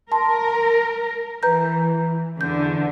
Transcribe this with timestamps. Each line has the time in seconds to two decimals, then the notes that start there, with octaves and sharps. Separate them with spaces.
0.12 A#4 A5 C6
1.43 E3 B4 A#5 G6
2.41 E2 D3 G6